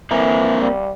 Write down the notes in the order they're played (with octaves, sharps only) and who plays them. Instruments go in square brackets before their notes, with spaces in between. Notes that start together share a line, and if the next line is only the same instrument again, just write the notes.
[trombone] E3 [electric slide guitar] A#3 C4 A#5
[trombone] G3